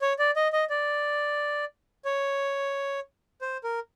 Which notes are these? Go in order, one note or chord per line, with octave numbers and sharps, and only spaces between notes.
C#5
D5
D#5
D#5
D5
C#5
C5
A#4